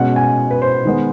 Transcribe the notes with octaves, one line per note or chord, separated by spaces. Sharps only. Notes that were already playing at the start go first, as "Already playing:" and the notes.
Already playing: B2 G#3 C#4 F#5
G#5
B4
C5
D#3 G#3 B3